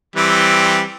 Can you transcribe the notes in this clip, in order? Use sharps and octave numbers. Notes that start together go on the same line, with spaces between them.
E3 G3 C4